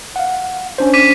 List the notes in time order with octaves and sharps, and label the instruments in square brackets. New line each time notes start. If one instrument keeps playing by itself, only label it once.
[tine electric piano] F5 F#5
C#4 D4 C5
[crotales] D6 B6 D#7